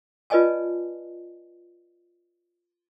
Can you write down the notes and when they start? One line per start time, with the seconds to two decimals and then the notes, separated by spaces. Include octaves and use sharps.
0.30 F4 B4 D5 D#5 G#5 A5